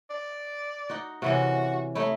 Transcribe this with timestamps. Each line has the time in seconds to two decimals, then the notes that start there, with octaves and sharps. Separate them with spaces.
0.10 D5
0.90 D#4 F#4
1.22 C3 E3 C#4 F#4
1.95 A3 D#4 E4 C#5